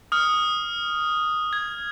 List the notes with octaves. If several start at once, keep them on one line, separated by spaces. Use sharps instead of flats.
D#6 F6
G#6